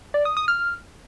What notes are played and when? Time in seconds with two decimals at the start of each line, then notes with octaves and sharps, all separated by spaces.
0.14 D5
0.25 D#6
0.37 D#6
0.48 F6